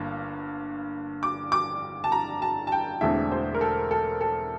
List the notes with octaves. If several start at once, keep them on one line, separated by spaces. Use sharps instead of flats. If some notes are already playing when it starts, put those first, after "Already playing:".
Already playing: G1 G2 D3 A#3
D6
D6
A5
A#5
A5
A5
G5
E1 E2 D3 A3 C4 E5
C5
A#4
A4
A4
A4